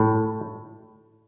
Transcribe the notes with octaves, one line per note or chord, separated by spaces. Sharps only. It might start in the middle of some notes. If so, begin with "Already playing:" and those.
Already playing: A2